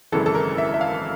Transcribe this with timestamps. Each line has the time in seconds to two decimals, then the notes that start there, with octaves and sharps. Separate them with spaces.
0.12 G#1 F#2 C#3 E3 A4
0.26 A4
0.35 A#4
0.58 E5
0.74 E5
0.81 F5